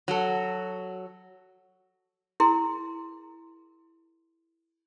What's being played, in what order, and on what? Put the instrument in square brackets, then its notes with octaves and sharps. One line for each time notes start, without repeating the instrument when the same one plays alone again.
[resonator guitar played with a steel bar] F#3 F#4 A4
[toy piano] E4 G#4 A#4 C6